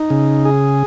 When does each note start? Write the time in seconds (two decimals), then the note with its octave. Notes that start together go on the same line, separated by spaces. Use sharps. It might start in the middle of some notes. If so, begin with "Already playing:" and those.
Already playing: D#4
0.10 C#3
0.45 G#4